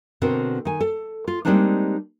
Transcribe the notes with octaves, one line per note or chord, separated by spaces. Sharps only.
B2 D3 C4 F#4 A#4 C5
D#3 G#5
A4
F4
G3 G#3 A#3 C4 D4 D#4